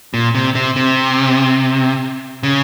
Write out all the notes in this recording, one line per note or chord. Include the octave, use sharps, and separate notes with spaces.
A#2
C3
C3
C3
C#3